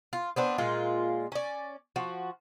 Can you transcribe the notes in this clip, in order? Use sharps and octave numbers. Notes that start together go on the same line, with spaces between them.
F4
B3 C4 D4
A#2 G#3 F4
C#4 D5
F3 F#4